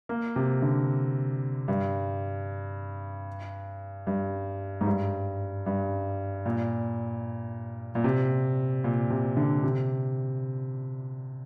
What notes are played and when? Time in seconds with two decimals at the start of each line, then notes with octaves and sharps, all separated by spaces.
0.09 A#3
0.36 C3
0.62 D3
1.68 G2
4.07 G2
4.81 G#2
4.87 G2
5.66 G2
6.46 A#2
7.95 A#2
8.04 C3
8.84 A#2
9.10 C3
9.37 D3
9.63 C3